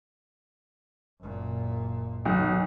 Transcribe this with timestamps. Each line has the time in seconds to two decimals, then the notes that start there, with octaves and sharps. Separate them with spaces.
1.21 F#1 A#2
2.25 B1 D#3